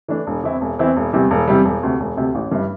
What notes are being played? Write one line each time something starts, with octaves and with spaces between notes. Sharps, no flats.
E3 A3 D4
E1
E2 E3 C4 E4
E1
E2 E3 C4 E4
E1
E2 C3 G3
E1
E2 C3 G3
E1
D2 C3
E1
D2 C3
A1
G2 G3 E4